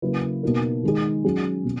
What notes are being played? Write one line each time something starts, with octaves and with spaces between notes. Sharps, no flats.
C#3 F#3 A#3 E4 B4
B2 A#3 D#4 A#4
D#3 G#3 D#4 G#4
F#3 C#4 G#4
B2